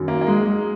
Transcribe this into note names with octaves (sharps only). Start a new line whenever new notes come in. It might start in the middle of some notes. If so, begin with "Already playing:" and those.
Already playing: F#2 D#3 F#3
A#3
A#3
G#3
G#3